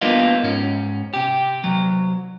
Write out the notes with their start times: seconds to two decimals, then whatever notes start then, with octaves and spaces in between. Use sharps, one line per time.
0.01 G3 A#3 B3 D4 D#4 F4
0.43 G#2 C#4
1.14 C3 G4
1.64 C2 G#2 F#3